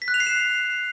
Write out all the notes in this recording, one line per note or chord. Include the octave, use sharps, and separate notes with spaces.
B6
F#6
F7
C7
E7